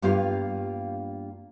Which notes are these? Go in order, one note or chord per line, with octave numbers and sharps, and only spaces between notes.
G2 A#3 B3 F4 G4 F5